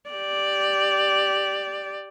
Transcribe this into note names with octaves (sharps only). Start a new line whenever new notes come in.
G4 D5